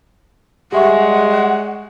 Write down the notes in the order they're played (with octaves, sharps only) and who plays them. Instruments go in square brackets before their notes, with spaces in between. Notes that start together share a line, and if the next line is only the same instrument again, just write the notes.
[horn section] G3 G#3 [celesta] G4 E5 C#6 [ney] F#5